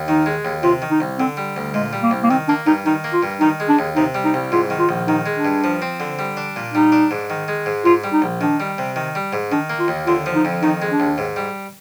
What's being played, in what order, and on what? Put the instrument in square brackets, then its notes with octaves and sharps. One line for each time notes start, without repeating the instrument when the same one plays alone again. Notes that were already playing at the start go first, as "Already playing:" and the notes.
Already playing: [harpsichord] D#2
[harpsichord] D#3 [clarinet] D#4
[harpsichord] G#3
D#2
[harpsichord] C3 [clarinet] F4
[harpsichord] D#3
[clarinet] D#4
[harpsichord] C2
[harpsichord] D3 [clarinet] C4
[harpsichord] G3
D2
[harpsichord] A#2 [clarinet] G#3
[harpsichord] G3
[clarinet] A#3
[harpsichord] C2
[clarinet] A#3
[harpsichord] D#3 [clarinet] C4
[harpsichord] A#3 [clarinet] D4
[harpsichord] G2 [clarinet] D#4
[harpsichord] D#3 [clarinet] D#4
[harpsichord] A#3
[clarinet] F4
[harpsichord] G2
[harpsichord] D#3 [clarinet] D#4
[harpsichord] G#3
[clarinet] D4
[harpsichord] D#2
[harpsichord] C3 [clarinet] D#4
[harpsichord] G3
[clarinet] D#4
[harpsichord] C2
[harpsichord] G#2 [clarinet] F4
[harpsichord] D#3
[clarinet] F4
[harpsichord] A#1
[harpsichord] D#3 [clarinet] D#4
[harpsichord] G#3
[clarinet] D4
[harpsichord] G2
F3
C4
D3
G3
D4
A#2
[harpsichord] G3 [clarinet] D#4
[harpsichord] D4
G#2
D#3
G#3
G#2
[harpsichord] G#2 [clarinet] F4
[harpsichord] G3
[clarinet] D#4
[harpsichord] A#1
[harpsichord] D#3 [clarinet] D4
[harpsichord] G3
C3
D#3
G3
G#2
[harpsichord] D#3 [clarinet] D4
[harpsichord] A#3
[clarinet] F4
[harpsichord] D#2
[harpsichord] D3 [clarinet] F4
[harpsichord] F3
[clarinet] D#4
[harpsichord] F2
[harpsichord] D#3 [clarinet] D#4
[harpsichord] G#3
[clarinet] D4
[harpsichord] D#2
G#2
G3